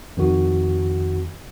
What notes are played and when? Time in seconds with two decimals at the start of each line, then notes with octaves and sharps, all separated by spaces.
0.17 F2 D#3 F#4